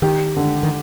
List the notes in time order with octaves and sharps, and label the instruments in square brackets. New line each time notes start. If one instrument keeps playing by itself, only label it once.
[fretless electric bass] D#3 [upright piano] G4
[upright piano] D3
[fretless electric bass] D#3